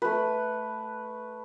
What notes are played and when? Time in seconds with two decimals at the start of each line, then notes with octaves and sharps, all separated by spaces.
0.02 A3 B4